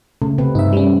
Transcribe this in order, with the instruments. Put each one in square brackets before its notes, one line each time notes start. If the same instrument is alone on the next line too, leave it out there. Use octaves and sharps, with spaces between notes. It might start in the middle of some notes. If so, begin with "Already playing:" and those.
[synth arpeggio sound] C#3 [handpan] A3
[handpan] C3 C4 B4
[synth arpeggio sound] G2 [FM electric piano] D#4 E5
[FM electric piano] G3 C#4